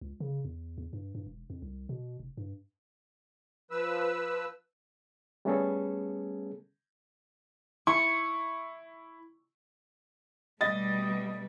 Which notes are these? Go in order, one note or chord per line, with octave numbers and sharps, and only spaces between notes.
C#2
C#3
E2
E2
G2
G2
E1
F2
C2
B2
F1
G2
F3 B4 E6
G3 A3 B3 C#4 G#4 A4
E4 C#6
B2 G3 A3 D#5 A6